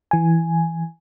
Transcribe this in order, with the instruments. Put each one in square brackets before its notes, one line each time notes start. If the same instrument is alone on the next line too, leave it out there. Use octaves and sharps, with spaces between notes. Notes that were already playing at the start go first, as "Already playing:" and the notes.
[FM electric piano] E3 G#5